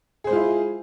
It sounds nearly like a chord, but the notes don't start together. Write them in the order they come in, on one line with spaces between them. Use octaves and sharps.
G#4 C5 G#3 F4 E4